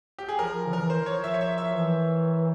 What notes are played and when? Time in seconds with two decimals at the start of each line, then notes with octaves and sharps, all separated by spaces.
0.19 G4
0.29 G#4
0.39 F3 A#4
0.67 C#3
0.73 E3 A#4
0.90 C5
1.01 E3
1.06 F3 C#5
1.24 E5
1.34 C#5
1.41 E5
1.58 E5
1.74 E3